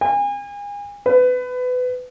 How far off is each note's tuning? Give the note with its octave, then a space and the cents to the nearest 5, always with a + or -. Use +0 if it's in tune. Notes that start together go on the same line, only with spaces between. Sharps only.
G#5 -35
B4 +25